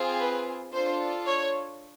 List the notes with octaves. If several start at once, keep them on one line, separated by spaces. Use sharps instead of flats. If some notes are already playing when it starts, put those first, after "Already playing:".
Already playing: C4 F4 G#4
B4
D4 F4 A4 C5
C#5